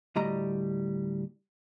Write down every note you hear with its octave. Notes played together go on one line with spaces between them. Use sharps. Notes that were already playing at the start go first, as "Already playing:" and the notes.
D2 A2 G3 D#5 A#5